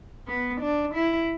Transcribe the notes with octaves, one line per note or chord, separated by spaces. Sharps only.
B3
D4
E4